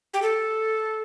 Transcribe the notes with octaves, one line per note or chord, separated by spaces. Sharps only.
G4
A4